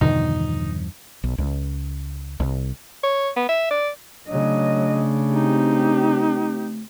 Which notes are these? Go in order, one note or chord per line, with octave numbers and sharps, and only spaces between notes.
E2 G2 B2 D3 D#3 F3 D#4
B1
C#2
C2
C#5
B3
E5
D5
C#3 F#3 A3 D4 D#5
C4 D#4 G4